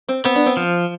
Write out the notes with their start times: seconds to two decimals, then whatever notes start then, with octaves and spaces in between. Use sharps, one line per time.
0.09 C4
0.25 B3 C4
0.36 D4
0.46 C4
0.57 F3